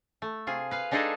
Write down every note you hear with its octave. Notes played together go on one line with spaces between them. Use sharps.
A3
C3 F4 G#4
B4 F5
G#3 D4 D#4 G#4 A4 D#5